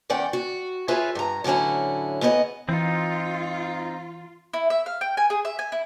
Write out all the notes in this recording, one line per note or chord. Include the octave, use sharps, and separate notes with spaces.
E2 C#4 D5 F#5 G5
F#4
F4 G#4 B4 C#5 E5
G2 A#5
A2 D3 F#3 C#4 E4
D#2 B3 G#4 D#5
E3 C4 D#4 F4
E4
E5
F5
G5
G#5
G#4
E5
G#5
E4